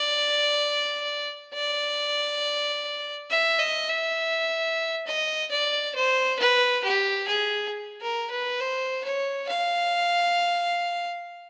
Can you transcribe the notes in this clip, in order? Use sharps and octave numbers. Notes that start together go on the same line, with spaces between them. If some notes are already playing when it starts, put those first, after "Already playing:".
Already playing: D5
D5
E5
D#5
E5
D#5
D5
C5
B4
G4
G#4
A#4
B4
C5
C#5
F5